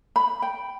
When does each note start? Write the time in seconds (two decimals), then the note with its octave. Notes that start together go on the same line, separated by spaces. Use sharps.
0.16 B5
0.42 G5